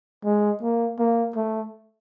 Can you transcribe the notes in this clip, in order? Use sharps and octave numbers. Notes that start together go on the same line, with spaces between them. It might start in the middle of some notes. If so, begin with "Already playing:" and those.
G#3
A#3
A#3
A3